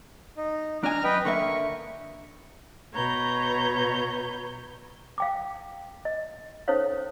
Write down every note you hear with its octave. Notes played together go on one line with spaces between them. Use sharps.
D#4
D4 G#5 A#5 F6
F#2 B4 D#5 G5
D3 A#3 E5 C#6
B2 B4 C#5 A#5 G6
F5 G5 D6
D#5
C#4 D#4 A4 C5 C#5 F5